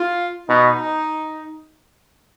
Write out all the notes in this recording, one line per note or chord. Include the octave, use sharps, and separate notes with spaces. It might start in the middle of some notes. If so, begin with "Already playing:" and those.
Already playing: F4
B2 D#4